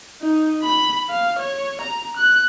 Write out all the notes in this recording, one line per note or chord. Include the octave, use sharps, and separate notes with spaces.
D#4
B5
F5
C#5
A#5
F#6